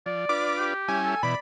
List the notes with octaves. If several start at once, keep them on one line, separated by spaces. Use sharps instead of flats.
F3 D5
D4 F4 B4 D6
G4
G3 C#4 E4 G#5
A4
B2 E3 D5 B5